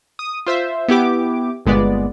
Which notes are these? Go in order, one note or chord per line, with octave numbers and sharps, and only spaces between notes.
D#6
F4 C5 E5
B3 E4 G4 D6
G1 A#2 G#3 B3 D5